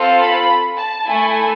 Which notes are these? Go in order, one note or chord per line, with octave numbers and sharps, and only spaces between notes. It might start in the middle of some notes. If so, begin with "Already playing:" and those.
Already playing: C4 F4 A4
B5
A5
A3 E4 A4 G#5